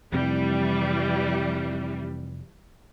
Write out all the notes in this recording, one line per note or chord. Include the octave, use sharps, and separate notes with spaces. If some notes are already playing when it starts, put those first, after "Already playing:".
F2 C3 E3 G3